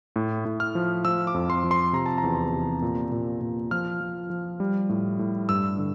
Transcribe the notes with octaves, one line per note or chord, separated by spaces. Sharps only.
A2
A2
F6
F3
F3 E6
D6
F2
C6
F3
C6
C3 A#5
A5
A#5
E2
C3
A#2
A#2
A#2
F3 F6
F3
F3
G3
A2
A2
G2 E6
D3